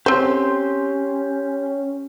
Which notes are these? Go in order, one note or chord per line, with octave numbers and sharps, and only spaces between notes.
C4 C#4 G4 C5 C6